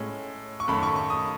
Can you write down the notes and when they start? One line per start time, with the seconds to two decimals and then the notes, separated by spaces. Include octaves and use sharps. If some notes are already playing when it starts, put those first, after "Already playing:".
Already playing: A2 G#3 C#4
0.60 C#6
0.68 F#2 D#3 A3 B5
0.83 C#6
0.96 C#6
1.10 D#6